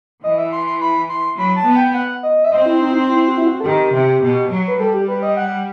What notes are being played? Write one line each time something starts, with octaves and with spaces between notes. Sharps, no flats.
E3 D#5
E5
C6
C6
B5
C6
F#3 B5
A5
B3
G5
F#5
D#5
E5
C4 D#5
E4
D#4
E4
D#4
E4
F#4
E4
F#4
A4
D#3 G4
C3
B2
F#3
B4
G3 A4
G4
B4
D#5
F#5